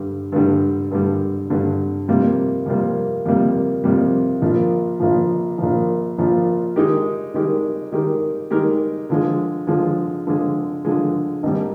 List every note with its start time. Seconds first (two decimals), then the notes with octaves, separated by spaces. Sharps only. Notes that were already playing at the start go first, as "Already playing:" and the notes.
Already playing: G2 D3 G3
0.32 G2 D3 G3
0.91 G2 D3 G3
1.50 G2 D3 G3
2.08 F2 C3 G3 A#3
2.66 F2 C3 G3 A#3
3.26 F2 C3 G3 A#3
3.84 F2 C3 G3 A#3
4.42 A#1 A#2 F3
5.00 A#1 A#2 F3
5.58 A#1 A#2 F3
6.18 A#1 A#2 F3
6.76 D#3 G#3 D#4 G4 A#4
7.34 D#3 G#3 D#4 G4 A#4
7.92 D#3 G#3 D#4 G4 A#4
8.51 D#3 G#3 D#4 G4 A#4
9.10 D3 F3 G#3
9.67 D3 F3 G#3
10.27 D3 F3 G#3
10.85 D3 F3 G#3
11.43 G#1 G#2 G3